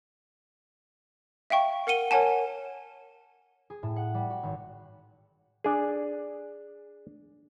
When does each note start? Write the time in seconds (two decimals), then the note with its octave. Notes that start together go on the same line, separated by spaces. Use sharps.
1.50 E5 F5 G5 C#6
1.87 A#4 F#5 C#7 D#7 G7
2.11 A#4 C#5 F#5 G#5 A5
3.70 G#4
3.83 A2
3.96 F#5
4.14 G3
4.30 F#4
4.43 G#1
5.64 D4 G#4